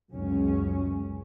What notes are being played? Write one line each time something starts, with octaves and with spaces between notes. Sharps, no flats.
C#2 F#2 C#4